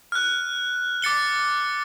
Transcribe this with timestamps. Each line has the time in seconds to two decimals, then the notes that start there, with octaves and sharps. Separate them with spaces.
0.12 F6 F#6
1.02 D6 A6 C#7 G7